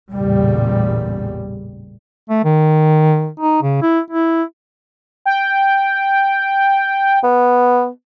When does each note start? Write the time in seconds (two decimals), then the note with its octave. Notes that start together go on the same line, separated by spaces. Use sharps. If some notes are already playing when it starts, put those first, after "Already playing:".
0.12 A1 E2 A#2 C#3 G3
2.29 A3
2.45 D#3
3.40 D#4
3.62 C#3
3.82 E4
4.10 E4
5.26 G5
7.24 B3